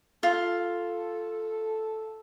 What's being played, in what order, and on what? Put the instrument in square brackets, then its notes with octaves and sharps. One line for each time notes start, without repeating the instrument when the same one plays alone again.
[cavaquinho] F4 [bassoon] A4